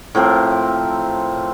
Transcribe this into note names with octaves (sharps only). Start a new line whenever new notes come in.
A2 F3 C4 A#4